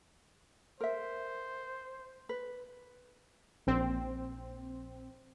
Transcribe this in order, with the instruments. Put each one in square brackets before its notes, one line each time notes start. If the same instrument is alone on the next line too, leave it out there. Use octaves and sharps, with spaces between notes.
[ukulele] A#4 E5 [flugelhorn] C5
[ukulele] B4
[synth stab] A#1 C4